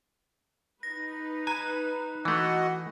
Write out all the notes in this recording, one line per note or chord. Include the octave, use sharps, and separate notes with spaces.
D#4 B4 A#6
G#5 A#5 F#6
E3 A3 F#4 D#5 F#5